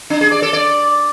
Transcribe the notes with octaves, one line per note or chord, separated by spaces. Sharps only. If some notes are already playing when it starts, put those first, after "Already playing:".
D4
G#4
D5
A4
D5